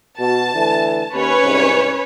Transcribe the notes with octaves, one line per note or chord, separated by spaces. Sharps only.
B2 F#4 A5
D3 E3 A3
D#2 C#4 B4 C#5
C2 G#2